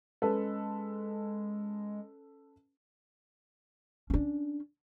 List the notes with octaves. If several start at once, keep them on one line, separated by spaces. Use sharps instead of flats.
G#3 C#4 A4 B4
C#4 D4